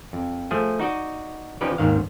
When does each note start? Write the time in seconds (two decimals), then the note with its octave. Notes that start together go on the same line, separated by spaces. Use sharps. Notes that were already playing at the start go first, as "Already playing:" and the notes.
0.13 F2
0.51 F3 A3 G#4
0.79 D#4 F#4 D5 D#5
1.61 F3 C#4 D#4 G4 B4 D5
1.78 G#1 D#2 G#2 D#3 F5